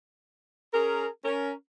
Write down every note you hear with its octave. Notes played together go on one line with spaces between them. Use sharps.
C#4 G#4 A#4
C#4 A#4